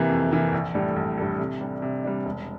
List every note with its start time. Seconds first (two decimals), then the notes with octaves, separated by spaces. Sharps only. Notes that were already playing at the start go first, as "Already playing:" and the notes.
Already playing: C3 E3 A#3
0.10 F2
0.31 C3 E3 A#3
0.53 A#1
0.74 A2 G3 D4 A4
0.96 A#1
1.18 A2 G3 D4 A4
1.39 C3
1.61 G3 D4
1.82 C3
2.04 G3 D4
2.25 E1